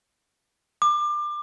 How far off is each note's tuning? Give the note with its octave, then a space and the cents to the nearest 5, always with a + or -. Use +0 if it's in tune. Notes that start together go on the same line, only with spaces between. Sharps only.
D6 +25